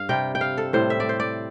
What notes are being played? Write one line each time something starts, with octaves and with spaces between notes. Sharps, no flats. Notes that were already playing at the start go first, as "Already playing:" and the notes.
Already playing: G2 F5
C3 G3 G5
G5
F5
A4
A2 G3 C5
E5
D5
C5
D5